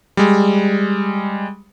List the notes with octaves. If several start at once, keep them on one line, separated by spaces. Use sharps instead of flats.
G3 G#3